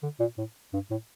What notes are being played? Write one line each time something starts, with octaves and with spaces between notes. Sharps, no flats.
D3
A#2
A2
G2
A2